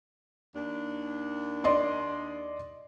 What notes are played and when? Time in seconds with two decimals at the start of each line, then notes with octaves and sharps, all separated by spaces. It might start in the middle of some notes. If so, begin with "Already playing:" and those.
0.55 D#2 D4
1.64 D5 D#5 C6